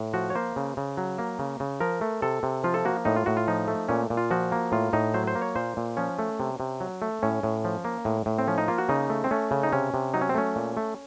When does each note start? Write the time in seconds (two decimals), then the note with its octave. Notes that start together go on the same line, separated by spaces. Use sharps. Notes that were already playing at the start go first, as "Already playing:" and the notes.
Already playing: A2
0.14 F3 F#4
0.30 C#5
0.35 A#3 C5
0.56 C#3
0.77 C#3
0.97 F#3
1.18 A#3
1.39 C#3
1.60 C#3
1.80 F3 A#4
2.01 A3
2.22 C3 A4
2.43 C3
2.64 F3 F4
2.74 A4
2.85 A#3 F#4
3.05 A2 D#4
3.16 F4
3.26 A2 F#4
3.37 F4
3.48 F3 D#4
3.68 A3
3.89 A#2 C#4
4.10 A#2
4.17 F4
4.31 F3 F#4
4.52 A#3
4.72 A2 F4
4.93 A2 D#4
5.14 F#3 C5
5.27 C5
5.35 A#3
5.42 C#5
5.56 A#2 C5
5.77 A#2
5.97 F3 C#4
6.19 A3
6.40 C3
6.60 C3
6.81 F#3
7.02 A3
7.23 A2 C#4
7.43 A2
7.65 F3
7.85 A#3
8.05 A2
8.26 A2
8.38 C4
8.47 F3 C#4
8.58 D#4
8.68 A#3 F4
8.78 F#4
8.89 C#3 D#4
9.10 A3
9.24 C4
9.31 A3 C#4
9.51 C#3
9.63 D#4
9.72 C3 C#4
9.94 C3
10.14 F#3 D#4
10.21 C#4
10.29 C4
10.35 A3 C#4
10.56 A#2
10.77 A3